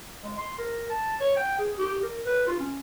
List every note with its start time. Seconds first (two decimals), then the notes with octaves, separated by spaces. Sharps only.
0.24 G#3
0.38 C6
0.58 A#4
0.90 A5
1.20 C#5
1.37 G5
1.59 G#4
1.78 G4
2.03 A#4
2.26 B4
2.47 F4
2.59 C#4